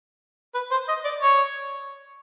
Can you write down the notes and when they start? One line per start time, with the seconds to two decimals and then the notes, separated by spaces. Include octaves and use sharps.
0.54 B4
0.71 C5
0.88 D#5
1.04 D5
1.22 C#5